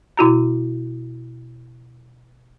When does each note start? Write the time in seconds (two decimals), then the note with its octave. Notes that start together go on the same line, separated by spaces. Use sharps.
0.17 B2 E4 F#4 A#5